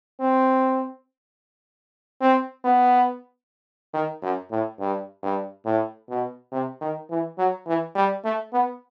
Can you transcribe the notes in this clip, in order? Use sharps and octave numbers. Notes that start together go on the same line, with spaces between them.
C4
C4
B3
D#3
F#2
A2
G2
G2
A2
B2
C3
D#3
E3
F#3
E3
G3
A3
B3